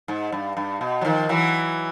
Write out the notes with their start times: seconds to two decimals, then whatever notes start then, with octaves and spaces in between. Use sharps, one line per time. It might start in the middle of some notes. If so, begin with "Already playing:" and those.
0.08 G#2
0.32 G2
0.57 G2
0.81 B2
1.01 F#3
1.05 D#3 F3
1.29 E3 F#3